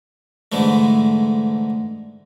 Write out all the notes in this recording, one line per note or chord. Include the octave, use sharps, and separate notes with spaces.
G#2 D3 E3 G#3 A3